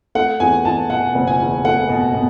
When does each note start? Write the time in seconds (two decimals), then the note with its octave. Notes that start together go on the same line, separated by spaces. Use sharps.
0.15 A3 F#5
0.40 E2 G#5
0.65 E2 A5
0.90 B2 F#5
1.15 F#1
1.27 G#5
1.40 E2
1.65 A3 F#5
1.90 B2
2.14 B2